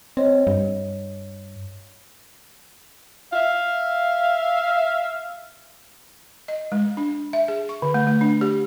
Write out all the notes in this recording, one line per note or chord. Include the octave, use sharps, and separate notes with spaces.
C4 C#5 D#5
G2
E5 F5
D#5
G#3
D4
E5
G#4
C#6
D3
A3
A3
D4
G4